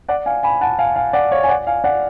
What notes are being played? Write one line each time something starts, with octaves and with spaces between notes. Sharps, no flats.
D5 F#5
F5 G#5
G#5 B5
F#5 A5
F5 G#5
F5 G#5
D5 F#5
C#5 F5
G#5
D5 F#5
F5 G#5
D5 F#5